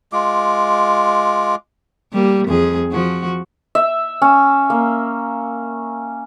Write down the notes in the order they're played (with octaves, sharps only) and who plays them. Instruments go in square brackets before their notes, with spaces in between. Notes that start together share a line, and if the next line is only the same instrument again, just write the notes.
[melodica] G#3 F4 D6
[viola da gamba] G3 A#3
F2 G#4
F3 F#4
[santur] E5
C#4
A#3